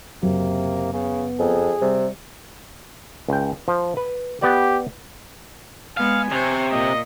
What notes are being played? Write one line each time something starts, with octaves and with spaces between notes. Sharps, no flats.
F#1 F#2 C3 F#3 A#3
C#3 B3
F2 G#4
C3 G3
C#2 G5
F3
B4
B3 G4 D5
G#3 B3 F5 G#5
C3 C5 C#5
A#2 D#5